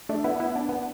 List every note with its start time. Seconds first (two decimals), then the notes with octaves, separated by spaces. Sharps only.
0.09 A3 D4
0.24 B3 E4
0.40 B3 E4
0.56 D4
0.69 B3